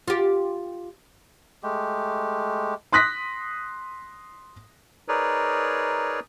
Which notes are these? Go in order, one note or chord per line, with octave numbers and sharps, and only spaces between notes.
F4 G4
G#3 A3 G4
C6 D#6 F#6 A#6 B6
D#4 G#4 A#4 B4 C#5 D5